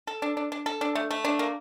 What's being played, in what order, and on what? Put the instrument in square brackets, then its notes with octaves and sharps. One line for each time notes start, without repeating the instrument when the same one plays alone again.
[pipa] A4
D4
D4
D4
A4
D4
A3
A3
D4
A#3